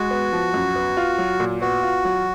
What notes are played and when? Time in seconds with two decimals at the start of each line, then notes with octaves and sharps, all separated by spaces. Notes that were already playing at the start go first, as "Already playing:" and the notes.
Already playing: G#3 F#4
0.11 B3
0.33 F3
0.54 F#2
0.76 B3
0.97 F4
1.18 F#3
1.40 A#2
1.61 B3 F#4
1.83 F4
2.05 F#3